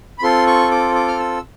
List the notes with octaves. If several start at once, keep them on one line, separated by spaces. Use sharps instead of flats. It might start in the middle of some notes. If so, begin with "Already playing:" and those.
B5
C4 F4 A4 C6
C#6
D6
D6
F6
E6